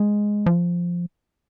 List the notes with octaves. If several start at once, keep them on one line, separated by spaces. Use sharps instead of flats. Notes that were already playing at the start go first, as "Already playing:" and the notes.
Already playing: G#3
F3